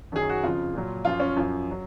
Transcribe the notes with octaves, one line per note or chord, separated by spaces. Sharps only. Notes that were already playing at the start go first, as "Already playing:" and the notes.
F#2 D#3 F#3 G#4
F#4
F2 C#3 F3 F4
A#2 F#3
F#2 F3 F4
C#4
F#2 F3
F#3